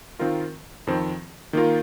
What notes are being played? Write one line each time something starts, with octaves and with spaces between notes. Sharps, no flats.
D#3 C4 F4 A#4
F2 D#3 C4
D#3 A#3 F4 A#4